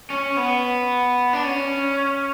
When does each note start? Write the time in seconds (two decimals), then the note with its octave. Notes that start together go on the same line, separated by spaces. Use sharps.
0.10 C#4
0.37 B3
1.33 D4
1.44 C#4